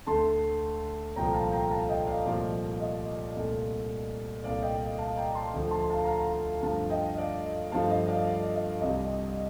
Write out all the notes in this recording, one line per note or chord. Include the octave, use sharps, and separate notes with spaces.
D2 D3 A3 A5 C6
C2 A#2 F3 A3 G5 A#5
F5 A5
G5 A#5
F5 A5
D#5 G5
D5 F5
C2 A#2 F3 A3 D5
D#5
C2 A#2 A3
C2 A#2 A3 D5 F5
D#5 G5
F5 A5
G5 A#5
A5 C6
D2 D3 F3 A3
A5 C6
F5 A5
A#5
F5 A5
G2 D3 F3 A3 F5 A5
D#5 G5
D5 F5
G2 F3 A3 F5 A5
D#5
D5 F5
D5
D#5
C2 C3 G3 D#5